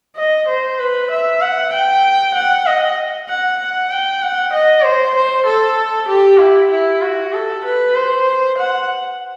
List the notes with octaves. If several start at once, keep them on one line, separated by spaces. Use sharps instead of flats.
D#5
C5
B4
E5
F#5
G5
F#5
D#5
F#5
F#5
G5
F#5
D#5
C5
C5
A4
G4
E4
E4
F#4
A4
B4
C5
F#5